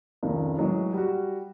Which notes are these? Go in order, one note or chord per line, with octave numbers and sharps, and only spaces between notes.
F1 C#2 D#3
A2 E3 F#3 G#3
G3 F#4